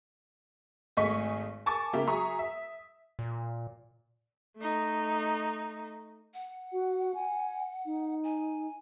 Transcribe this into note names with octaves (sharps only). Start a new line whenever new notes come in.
G#1 A3 G#4 D#5 C#6 B6
G#5 A5 C#6 D6 A6
C#3 A#3 G4 E5
F#3 G#4 E5 A#5 C#6 D#6
E5
A#2
A3 D#4
F#5
F#4
G#5
D#4
G#5